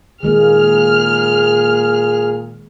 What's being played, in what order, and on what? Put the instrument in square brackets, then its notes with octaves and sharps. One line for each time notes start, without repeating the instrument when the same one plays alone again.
[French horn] A#2 [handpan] D#3 G#3 A#3 [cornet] G#4 [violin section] F6